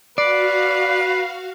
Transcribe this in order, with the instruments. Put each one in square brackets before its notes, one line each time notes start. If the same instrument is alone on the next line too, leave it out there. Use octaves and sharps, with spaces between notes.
[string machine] F#4 F5 [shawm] B4 [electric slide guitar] D5 [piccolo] C7